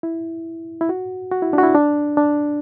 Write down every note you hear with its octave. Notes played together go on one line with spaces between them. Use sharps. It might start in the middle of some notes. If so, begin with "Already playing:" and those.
E4
E4
F#4
F#4
E4
D4
F#4
E4
D4
D4